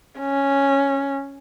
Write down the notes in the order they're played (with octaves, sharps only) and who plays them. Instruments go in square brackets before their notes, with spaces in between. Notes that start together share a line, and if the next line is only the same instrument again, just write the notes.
[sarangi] C#4